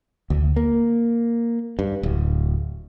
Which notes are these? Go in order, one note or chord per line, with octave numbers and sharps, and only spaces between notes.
D2
A#3
G2
D1